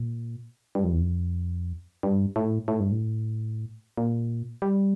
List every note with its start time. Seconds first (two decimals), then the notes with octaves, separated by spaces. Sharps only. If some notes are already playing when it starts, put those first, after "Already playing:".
Already playing: A#2
0.75 G2
0.84 F2
0.92 E2
1.01 F2
2.03 G2
2.36 A2
2.68 A2
2.80 G2
2.92 A2
3.97 A#2
4.62 G3